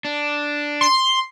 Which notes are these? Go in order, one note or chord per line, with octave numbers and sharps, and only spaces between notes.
D4
C6